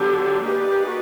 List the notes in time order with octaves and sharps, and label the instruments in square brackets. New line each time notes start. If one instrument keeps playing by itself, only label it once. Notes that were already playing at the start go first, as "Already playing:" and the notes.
Already playing: [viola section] D3 F#3 B3 D4 [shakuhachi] G4
[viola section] A#3 D#4 G#4 B4 D5 [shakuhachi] G4
[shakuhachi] F#4